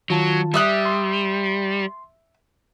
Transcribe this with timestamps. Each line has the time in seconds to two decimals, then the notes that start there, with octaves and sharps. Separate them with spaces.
0.10 D#3 F#3 F4 A5
0.54 G3 E5 D#6 F#6
0.86 C6